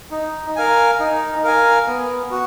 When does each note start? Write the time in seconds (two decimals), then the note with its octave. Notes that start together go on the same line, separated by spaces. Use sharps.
0.11 D#4
0.56 A#4 F5 G#5
1.00 D#4
1.44 A#4 F5 G#5
1.87 B3
2.31 F#4